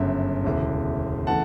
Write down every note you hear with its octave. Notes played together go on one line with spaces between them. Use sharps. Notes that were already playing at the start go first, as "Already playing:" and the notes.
Already playing: G1 F#2 C#3 E5
E1 D2 C#3 E3
C#3 E3 A3 F#5 A5